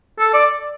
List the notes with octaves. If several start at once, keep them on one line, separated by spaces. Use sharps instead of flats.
A4
D5